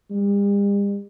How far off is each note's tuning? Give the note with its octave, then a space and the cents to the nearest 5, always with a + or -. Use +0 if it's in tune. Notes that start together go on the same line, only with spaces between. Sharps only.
G3 +45